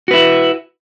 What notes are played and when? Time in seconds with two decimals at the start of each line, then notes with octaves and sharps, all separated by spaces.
0.08 F#4
0.11 B4
0.14 E4